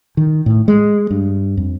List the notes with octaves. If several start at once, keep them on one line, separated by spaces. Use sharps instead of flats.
D#3
A2
G#3
G2
F2